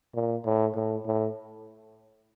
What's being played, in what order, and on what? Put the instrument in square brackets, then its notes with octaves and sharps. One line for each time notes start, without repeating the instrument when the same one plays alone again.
[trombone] A#2
A2
A2
A2